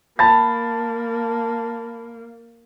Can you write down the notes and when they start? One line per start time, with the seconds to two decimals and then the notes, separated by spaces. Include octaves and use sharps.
0.19 A#3 A5 B5 A6